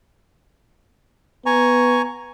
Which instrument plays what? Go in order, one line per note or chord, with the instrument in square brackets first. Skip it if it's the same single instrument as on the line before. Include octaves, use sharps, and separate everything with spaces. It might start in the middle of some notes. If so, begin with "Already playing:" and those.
[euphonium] B3 [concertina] G#5 A#5 C#6